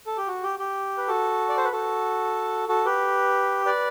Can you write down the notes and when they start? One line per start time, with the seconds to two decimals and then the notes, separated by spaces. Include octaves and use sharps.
0.07 A4
0.17 G4
0.28 F#4
0.43 G4
0.59 G4
0.98 B4
1.07 F#4 A4
1.49 D5
1.57 C5
1.64 B4
1.72 F#4 A4
2.69 F#4 A4
2.85 G4 B4
3.65 B4 D5